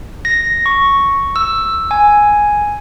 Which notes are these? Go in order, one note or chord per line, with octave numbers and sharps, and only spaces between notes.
A#6
C#6
E6
G#5